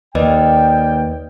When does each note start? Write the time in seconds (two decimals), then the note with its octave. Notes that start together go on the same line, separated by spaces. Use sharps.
0.15 D#2 B4 D5 D#5 G5